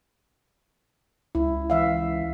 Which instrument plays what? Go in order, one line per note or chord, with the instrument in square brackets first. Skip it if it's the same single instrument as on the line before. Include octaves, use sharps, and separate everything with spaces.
[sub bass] C#2 [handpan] E4
[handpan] E3 E5 F5